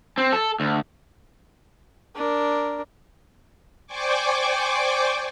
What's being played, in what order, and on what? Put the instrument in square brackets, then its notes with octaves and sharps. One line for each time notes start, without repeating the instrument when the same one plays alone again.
[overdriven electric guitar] C4
A4
D2
[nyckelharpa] D4 A#4
[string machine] C5 D5 G5 G#5 C#6 D6